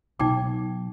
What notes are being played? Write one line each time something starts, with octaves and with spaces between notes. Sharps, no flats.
B2 F#3 D#4 G5 D6